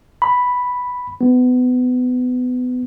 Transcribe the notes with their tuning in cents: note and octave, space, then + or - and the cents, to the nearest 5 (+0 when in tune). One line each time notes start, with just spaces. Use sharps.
B5 +0
B3 +25